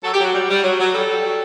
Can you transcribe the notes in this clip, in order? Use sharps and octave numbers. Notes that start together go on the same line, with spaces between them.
F#3 A4
G4
F#3 F#4
G3
G3
F#3
F#3
G3 A4
G3
F#3